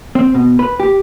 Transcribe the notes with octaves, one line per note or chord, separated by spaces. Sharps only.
C4
B2
B4
G4